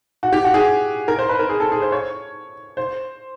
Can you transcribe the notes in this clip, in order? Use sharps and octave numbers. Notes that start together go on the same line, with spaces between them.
F#4
G4
F#4
G#4
A#4
C5
B4
A#4
G#4
A4
G#4
C5
C#5
C5